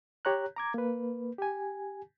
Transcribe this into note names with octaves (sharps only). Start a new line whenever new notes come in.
G4 C#5 A#5 F#6
A#5 D6 G#6
A#3 B4
G4 G#5